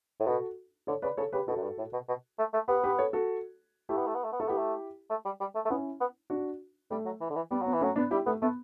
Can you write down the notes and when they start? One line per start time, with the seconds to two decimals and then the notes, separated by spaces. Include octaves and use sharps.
0.20 A2
0.27 B2 F#4 A4
0.87 D3 A4 C#5
1.02 C#3 B4 D5
1.17 C#3 A4 C#5
1.33 C#3 G4 B4
1.48 B2 F#4 A4
1.56 F#2
1.63 G2
1.78 A2
1.93 B2
2.08 B2
2.39 A3
2.54 A3
2.68 B3 G4 B4
2.84 G4 B4
2.99 A4 C#5
3.13 F#4 A4
3.89 A3 E4 G4
3.97 B3
4.06 A3
4.15 B3
4.24 A3
4.32 B3
4.40 A3 A4
4.48 B3 E4 G4
4.58 A3
5.10 A3
5.25 G3
5.40 G3
5.55 A3
5.65 A3
5.70 B3 C#4 E4
6.01 B3
6.30 D4 F#4
6.91 G3 A3
7.05 F#3
7.21 E3
7.30 D3
7.36 E3
7.51 G3 B3
7.62 F#3 B3
7.73 E3
7.81 F#3 A3 C#4
7.96 B3 D4
8.11 G3 E4 G4
8.26 A3 B3
8.42 A3 B3